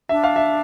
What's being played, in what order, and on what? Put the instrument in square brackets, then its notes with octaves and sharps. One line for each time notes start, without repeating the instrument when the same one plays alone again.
[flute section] D4 [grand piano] E5
[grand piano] F5
E5